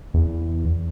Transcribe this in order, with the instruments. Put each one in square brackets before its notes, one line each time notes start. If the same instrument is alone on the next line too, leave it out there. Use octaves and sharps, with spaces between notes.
[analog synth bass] E2